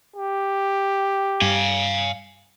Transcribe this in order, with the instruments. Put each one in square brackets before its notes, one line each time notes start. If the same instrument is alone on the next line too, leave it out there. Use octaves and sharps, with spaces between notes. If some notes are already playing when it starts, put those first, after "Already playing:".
[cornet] G4
[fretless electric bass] G2 [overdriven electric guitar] F5 G#5